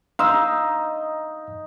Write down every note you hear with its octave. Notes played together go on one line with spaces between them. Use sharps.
D#4 F5 C6 E6